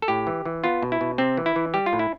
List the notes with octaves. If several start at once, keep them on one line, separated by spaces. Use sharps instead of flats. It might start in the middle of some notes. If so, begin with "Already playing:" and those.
A4
A2 G4
E3
E3
B3 F4
B2
E4
B2
C3 C4
E3
E4
E3
G3 G4
F4
A2
E4